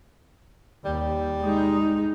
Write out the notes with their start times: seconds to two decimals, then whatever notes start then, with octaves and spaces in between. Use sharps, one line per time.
0.85 D#2 G3
1.42 G#3 D#4